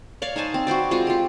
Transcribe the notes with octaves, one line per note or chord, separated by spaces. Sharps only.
C#5 D5 F5
D#4 C5 G#5 A5
C4
F#4 B4 C5 D5
G#3 C4 F4 F#4
F4 G4